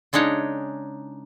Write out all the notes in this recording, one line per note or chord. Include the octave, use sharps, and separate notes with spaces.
C#3 G#3 D4 D#4 C#5